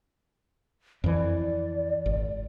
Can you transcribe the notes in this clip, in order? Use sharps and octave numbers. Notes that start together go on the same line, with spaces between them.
F2 E3 D5
G#1